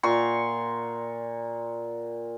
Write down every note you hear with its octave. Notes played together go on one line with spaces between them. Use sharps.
A#2 F#5 C6 C#6